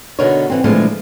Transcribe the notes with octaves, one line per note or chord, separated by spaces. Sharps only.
B2 D3 B3 D#4 A#4 C#5
D3 E3 C4
A#2 D3 E3 F3 G#3 A3